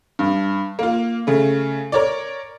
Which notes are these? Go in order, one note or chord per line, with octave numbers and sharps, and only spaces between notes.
G2
A#3 F4
C#3 A3
A#4 C#5 D5